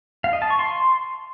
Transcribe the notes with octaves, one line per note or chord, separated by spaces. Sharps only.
F5
D#5
A5
C#6
C6